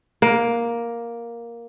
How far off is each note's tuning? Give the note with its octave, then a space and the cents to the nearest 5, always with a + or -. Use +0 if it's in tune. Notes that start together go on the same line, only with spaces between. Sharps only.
A#3 +5